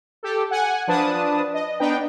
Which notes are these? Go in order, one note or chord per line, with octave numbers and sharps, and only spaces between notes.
G4 A4
F#5 G#5
F3 D4 B4 A5 D#6
D#5
B3 D4 D#4 B4 G5